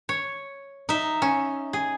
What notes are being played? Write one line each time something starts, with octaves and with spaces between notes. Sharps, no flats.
C#5
D#4 E5
C#4
G#4